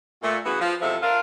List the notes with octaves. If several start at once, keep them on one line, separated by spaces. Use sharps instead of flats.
A#2 A3
C#3 E3 B3 F#4
F3 F4
E2 C3 F3 G#3 A4 E5
D4 F4 A#4